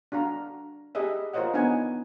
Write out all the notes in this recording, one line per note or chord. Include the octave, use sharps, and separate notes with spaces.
D4 F#4 F5 A#5
G4 G#4 D#5 E5
F4 A#4 C5 C#5 D#5 F#5
B3 D4 D#4 F#5 G#5